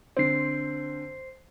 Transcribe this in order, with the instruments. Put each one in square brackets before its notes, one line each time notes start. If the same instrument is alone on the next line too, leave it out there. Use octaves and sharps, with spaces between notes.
[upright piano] D3 C4 [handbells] C5 C7